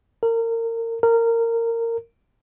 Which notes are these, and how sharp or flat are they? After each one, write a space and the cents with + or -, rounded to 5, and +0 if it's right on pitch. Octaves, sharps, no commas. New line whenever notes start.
A#4 -30
A#4 -20